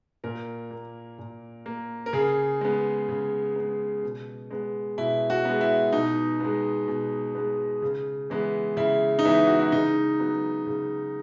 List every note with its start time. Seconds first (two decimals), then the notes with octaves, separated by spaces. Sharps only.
0.24 A#2 A#4
0.71 A#3
1.19 A#2
1.66 A#3
2.06 A#4
2.13 C#3 G#4
2.61 G#3 B3
3.09 C#3
3.56 G#3 B3
4.03 B2
4.50 G#3 B3
4.98 B2 E4
5.30 F#4
5.45 G#3 B3
5.61 E4
5.93 B2 D#4
6.40 G#3 B3
6.88 B2
7.35 G#3 B3
7.82 C#3
8.30 E3 G#3 B3
8.77 C#3 E4
9.19 D#4
9.25 E3 G#3 B3 E4
9.47 F#4
9.59 E4
9.72 C#3 D#4
10.20 F#3 B3
10.67 C#3